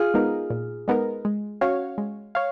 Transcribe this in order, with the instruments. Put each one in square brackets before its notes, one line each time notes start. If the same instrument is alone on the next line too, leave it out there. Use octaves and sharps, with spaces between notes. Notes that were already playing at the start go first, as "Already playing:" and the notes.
Already playing: [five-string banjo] F4 G#4
[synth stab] G#3 B3 D#4 A#4
A#2
G#3 B3 D#4 A#4
G#3
C#4 F#4 C#5 F5
G#3
C#5 F5